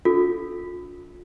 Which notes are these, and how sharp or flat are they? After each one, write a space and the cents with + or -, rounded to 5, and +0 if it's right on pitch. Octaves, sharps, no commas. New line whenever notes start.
D4 -30 F4 +30 A4 +0